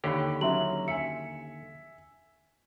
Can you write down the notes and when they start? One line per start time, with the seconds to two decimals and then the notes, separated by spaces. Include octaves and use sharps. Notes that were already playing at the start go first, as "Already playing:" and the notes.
0.04 D#2 D3 G4 C#5 G5 B5
0.41 F#3 C#4 E5 C6 F#7
0.88 E5 G#5 C#7